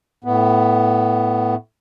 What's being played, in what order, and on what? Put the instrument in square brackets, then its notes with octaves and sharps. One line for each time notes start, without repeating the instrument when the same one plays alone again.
[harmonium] A2 B3